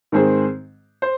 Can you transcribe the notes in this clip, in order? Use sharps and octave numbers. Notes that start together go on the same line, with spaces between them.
G#2 D#3 C4 G#4 C5
C5